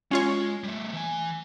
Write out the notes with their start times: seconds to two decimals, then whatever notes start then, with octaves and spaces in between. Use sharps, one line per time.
0.11 G#3 C#4 F4 C#5
0.64 G3 A3
0.93 E3 G#5